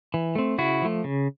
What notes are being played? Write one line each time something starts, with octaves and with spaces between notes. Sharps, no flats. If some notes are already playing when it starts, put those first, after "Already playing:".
E3
A3 C4
C#3 E4 F#4
F3 A3
C#3